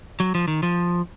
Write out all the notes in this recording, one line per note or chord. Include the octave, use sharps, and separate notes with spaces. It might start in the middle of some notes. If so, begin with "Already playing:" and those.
F#3
F3
D#3
F3